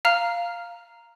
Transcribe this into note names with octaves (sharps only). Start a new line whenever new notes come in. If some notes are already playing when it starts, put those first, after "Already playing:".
F5 A#5 F6